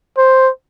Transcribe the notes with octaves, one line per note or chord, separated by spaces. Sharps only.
C5